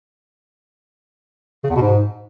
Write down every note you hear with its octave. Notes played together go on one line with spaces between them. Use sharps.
C#3
E2
B2
G#2